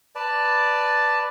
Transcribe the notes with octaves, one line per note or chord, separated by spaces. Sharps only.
B4 D5 A5